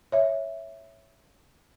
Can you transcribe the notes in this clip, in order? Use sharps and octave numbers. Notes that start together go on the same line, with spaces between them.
C#5 E5